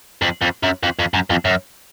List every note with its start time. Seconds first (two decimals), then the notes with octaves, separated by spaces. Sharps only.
0.22 F2
0.42 F2
0.63 F#2
0.83 F2
0.99 F2
1.14 F#2
1.30 F2
1.45 F#2